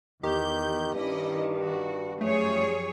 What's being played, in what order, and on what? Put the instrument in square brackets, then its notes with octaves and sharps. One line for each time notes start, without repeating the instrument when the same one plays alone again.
[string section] E2 G6 [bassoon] D#3 [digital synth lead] G4
[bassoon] G2 [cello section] D#3 [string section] C#4 E4 D#5
[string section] F#4
[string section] F#2 F3 G3 [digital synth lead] A3 [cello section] G#4 C#5